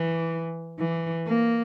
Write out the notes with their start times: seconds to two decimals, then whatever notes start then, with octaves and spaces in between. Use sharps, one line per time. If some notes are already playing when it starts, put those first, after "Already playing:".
Already playing: E3
0.79 E3
1.27 A#3